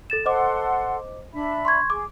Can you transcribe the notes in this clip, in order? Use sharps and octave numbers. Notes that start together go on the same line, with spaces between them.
A4 A6 E7
A4 C5 D#5 F#5 C6 D6
D4 E5 B5
C6 C#6 G#6
G#4 D6